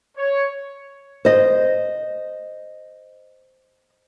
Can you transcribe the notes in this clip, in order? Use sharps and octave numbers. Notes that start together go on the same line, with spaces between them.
C#5
C5 D#5